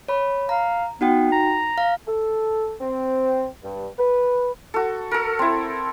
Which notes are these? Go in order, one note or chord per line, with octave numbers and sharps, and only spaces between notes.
C#5 B5
F5 A#5
B3 D#4 F#4 G5
A#5
F5
A4
C4
G2
B4
F#4 A4
A4 A#4
C4 E4